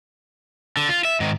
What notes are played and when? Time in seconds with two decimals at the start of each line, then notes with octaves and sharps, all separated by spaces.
0.77 D3
0.89 F4
1.05 E5
1.20 G#2 D#3